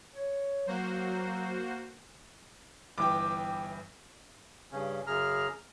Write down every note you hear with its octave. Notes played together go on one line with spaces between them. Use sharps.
C#5
F#3 A#3 F#4 C5
G1 E3 G5 D6
G2 C#3 C#4
F#2 C#3 G#4 A#5 F6